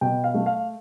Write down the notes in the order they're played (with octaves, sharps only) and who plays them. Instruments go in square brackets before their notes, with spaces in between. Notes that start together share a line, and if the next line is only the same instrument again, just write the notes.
[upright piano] B2 G5
F5
A3
F5